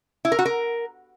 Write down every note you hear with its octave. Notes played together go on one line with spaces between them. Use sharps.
E4
A#4
F#4
A#4